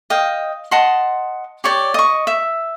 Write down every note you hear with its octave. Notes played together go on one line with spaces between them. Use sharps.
D#5 F5 G5
D#5 F#5 A5 C6
G4 C#5 D5 G5
D#5 C#6
E5